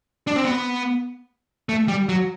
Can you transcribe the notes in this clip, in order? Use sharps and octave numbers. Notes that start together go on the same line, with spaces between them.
D4
C4
B3
A3
G3
F#3